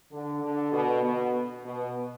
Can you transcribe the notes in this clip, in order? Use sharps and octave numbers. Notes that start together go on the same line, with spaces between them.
D3
D3
B2
B2
B2